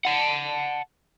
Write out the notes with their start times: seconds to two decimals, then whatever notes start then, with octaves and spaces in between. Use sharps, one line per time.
0.05 F#5 A5